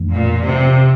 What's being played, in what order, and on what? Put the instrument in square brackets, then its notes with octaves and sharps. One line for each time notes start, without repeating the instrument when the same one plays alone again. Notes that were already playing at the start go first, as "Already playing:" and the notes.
Already playing: [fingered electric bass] F2 E3 A3 D4
[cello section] A#2
C3